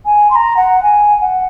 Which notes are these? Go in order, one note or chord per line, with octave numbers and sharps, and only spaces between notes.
G#5
C6
A#5
F#5
G#5
F#5